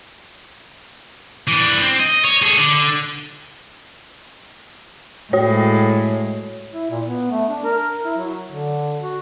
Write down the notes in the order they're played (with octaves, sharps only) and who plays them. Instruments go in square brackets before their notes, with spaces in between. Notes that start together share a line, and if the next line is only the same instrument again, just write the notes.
[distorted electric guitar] E3 D4
C4
D#5
C#5
G#4 A4
D3
[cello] A2 G#3 [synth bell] F#4 C#5
[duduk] E4
A#2
B3
A3
D4
A#4
E4
F#3
D3
F#4